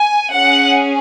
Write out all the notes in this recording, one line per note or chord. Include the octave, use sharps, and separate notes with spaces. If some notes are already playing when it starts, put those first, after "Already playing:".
Already playing: G#5
C#4 G#4 F#5